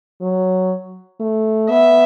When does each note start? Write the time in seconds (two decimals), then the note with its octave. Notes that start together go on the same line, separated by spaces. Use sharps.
0.21 F#3
1.20 A3
1.69 B3 E5